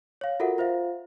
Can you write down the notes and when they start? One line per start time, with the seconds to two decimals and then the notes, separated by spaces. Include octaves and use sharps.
0.21 C#5 F5
0.40 F4 F#4 A4 A#4 E5 F#5
0.58 F4 C5 E5 F5